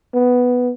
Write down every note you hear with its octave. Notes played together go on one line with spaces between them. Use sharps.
B3